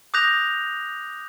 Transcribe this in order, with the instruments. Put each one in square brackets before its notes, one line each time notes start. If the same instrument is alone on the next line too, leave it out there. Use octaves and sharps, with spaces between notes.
[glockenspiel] D6 D#6 F#6 G6 A#6 F7